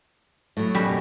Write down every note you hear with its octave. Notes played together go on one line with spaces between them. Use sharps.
A2 F#3
F#2 B2 G3